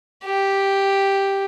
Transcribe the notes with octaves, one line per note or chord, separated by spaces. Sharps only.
G4